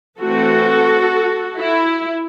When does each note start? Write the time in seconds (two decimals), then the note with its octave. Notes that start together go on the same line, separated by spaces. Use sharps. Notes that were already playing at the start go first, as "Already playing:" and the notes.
0.20 E3 A3 C4 F#4 A4
1.59 E4